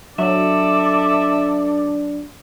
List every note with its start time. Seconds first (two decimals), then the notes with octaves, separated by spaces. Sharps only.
0.18 F#3 D4 A4 D5 E5